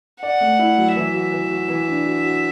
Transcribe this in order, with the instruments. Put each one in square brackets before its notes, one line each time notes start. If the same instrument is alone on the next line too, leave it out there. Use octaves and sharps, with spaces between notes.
[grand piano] D5 [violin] F#5
[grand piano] A3
E4
F#3
[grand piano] E3 [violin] E5
[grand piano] F#4
E3
F#4
E3
D4
F#4
F#4